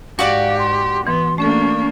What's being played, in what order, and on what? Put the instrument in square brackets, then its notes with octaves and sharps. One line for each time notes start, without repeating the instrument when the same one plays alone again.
[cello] G#2 G4 [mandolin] F#4 D5 D6 [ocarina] F5
[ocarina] C6
[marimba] E3 [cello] B3 [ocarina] C6
[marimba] A3 C#4 A4 [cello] A#3 D4 [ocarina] C#6